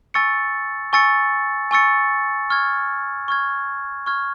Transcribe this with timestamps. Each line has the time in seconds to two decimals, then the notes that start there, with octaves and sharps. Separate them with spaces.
0.14 G#5 C#6 E6 A6 C#7
0.93 G#5 C#6 E6 A6 C#7
1.71 G#5 C#6 E6 A6 C#7
2.50 C#6 F6 G#6
3.28 C#6 F6 G#6
4.06 C#6 F6 G#6